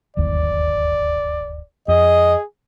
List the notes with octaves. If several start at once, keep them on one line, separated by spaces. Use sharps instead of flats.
D1 G1 D#2 D5
F2 G#4 D#5